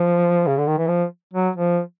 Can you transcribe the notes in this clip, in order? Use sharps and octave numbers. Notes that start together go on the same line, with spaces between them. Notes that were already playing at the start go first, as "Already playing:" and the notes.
Already playing: F3
C#3
D3
D#3
E3
F3
F#3
F3